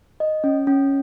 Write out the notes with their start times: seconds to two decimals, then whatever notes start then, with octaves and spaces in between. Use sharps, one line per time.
0.20 D#5
0.44 C#4
0.67 C#4